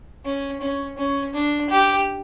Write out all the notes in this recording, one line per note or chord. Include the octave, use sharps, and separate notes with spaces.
C#4
C#4
C#4
D4
G4